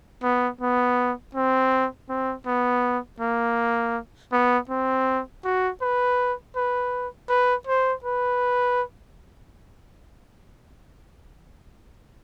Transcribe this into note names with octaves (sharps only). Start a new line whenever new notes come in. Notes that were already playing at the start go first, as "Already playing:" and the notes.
B3
B3
C4
C4
B3
A#3
B3
C4
F#4
B4
B4
B4
C5
B4